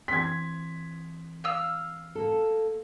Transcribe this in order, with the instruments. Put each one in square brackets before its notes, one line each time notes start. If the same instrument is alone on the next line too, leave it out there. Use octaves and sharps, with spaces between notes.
[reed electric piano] E3 C4 C6 [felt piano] G#6 B6
[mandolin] F5 E6
[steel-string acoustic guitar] A#3 A4